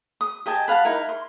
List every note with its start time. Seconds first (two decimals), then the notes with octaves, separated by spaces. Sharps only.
0.21 D#6
0.46 G4 D#5 G#5 A5
0.68 B4 F5 F#5 A5
0.85 D#4 E4 A#4
1.09 C6